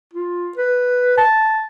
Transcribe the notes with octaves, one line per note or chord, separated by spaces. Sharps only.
F4
B4
A5